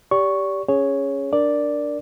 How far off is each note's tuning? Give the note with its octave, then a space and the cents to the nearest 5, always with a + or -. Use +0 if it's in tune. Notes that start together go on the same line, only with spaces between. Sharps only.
G4 +0 D5 -35 C#6 +0
C#4 +0 G#4 +0 C#5 +0
D4 +0 A#4 +0 D5 +0